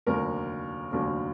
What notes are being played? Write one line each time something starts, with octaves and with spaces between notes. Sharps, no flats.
F1 D#2 D3 F#3 A#4
F1 D#2 D3 F#3